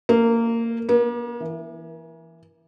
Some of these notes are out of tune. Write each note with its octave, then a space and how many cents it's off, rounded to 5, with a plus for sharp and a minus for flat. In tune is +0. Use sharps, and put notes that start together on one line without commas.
A#3 -20
A#3 +40
E3 +10